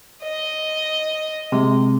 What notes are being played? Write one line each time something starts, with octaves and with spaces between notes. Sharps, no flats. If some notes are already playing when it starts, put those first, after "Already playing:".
D#5
C3 G#3